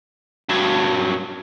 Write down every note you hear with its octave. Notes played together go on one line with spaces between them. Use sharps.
G2 F#3